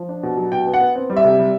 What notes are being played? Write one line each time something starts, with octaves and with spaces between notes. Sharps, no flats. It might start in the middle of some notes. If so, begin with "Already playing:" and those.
Already playing: F3
D4
B2
F#3
B2 G5
B3
F#5
B3
C4
G3
E5
C3
G3